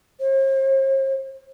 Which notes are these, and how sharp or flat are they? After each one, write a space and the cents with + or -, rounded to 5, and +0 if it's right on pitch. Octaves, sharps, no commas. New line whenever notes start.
C5 +45